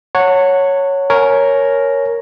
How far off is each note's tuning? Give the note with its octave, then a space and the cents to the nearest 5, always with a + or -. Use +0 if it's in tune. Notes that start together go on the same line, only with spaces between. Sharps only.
C#5 +0 F#5 -10 A5 +45
A#4 +0 C#5 +0 G#5 +30